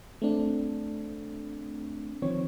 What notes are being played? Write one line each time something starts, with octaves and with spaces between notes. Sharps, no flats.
A3 C4 D4
D#3 F3 C4 C#5